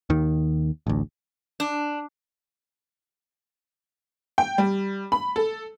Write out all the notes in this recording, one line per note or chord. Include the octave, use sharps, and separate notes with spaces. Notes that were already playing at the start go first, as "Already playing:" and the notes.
D#2 D#3
A1 D2
D4
G5
G3
B5
A4